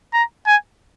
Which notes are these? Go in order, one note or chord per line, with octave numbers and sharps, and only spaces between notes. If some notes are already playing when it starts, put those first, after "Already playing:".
A#5
G#5